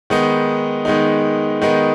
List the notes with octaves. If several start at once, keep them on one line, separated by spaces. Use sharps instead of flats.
D#3 G#3 B3 D#4
D#3 G#3 B3 D#4
D#3 G#3 B3 D#4